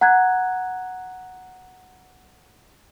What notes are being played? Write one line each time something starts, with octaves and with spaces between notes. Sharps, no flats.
F#5 A#5 F#6 G#6